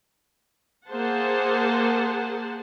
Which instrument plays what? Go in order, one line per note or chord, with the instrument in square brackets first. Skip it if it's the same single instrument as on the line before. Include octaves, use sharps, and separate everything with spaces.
[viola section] A#3 G#4 C5 F#5 A5